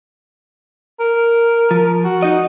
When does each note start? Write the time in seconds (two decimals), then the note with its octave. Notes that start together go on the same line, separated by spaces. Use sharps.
1.00 A#4
1.71 F3
2.04 F#4
2.23 D#4 D#5